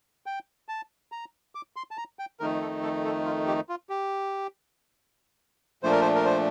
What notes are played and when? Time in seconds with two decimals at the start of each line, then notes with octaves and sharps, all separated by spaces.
0.26 G5
0.69 A5
1.12 A#5
1.55 D6
1.76 C6
1.91 A5
1.97 A#5
2.19 G5
2.40 F2 D#3 A3 D#4 A#4
2.61 A4
2.83 A4
3.04 A4
3.25 F4
3.47 G4
3.69 F4
3.89 G4
5.83 A#2 F3 A3 D4 C5
5.92 A#4
6.01 C5
6.15 A#4
6.25 C5